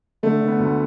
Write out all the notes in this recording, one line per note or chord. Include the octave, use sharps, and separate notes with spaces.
D3 A3
D3
B3
D2